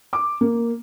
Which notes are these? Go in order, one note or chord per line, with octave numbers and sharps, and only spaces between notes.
D6
A#3